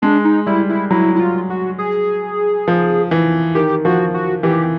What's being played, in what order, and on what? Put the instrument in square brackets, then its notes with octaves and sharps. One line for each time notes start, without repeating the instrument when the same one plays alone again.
[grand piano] G#3 [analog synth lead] D4
[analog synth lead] D#4
[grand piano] G3 [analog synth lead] E4
[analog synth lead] E4
[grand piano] F#3 [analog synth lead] E4
[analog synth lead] E4
F4
F#4
G#4
[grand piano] F3
E3
[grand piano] D#3 [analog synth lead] G4
[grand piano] F3 [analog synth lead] F#4
[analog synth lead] F#4
[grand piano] E3 [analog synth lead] G4